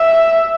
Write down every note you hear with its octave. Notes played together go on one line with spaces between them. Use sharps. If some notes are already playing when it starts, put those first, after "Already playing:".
Already playing: E5